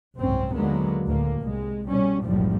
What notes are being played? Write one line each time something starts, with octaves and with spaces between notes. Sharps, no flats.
F#1 C2 G#2 C4 C#4
D#2 D3 F#3 G#3 A#3 B3
D2 A2 A#3
C2 G#3
B2 G3 C#4
F#1 B1 F#2 A2 F3 G3